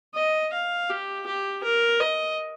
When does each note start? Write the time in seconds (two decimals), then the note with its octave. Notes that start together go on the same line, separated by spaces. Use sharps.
0.15 D#5
0.53 F5
0.90 G4
1.26 G4
1.63 A#4
2.00 D#5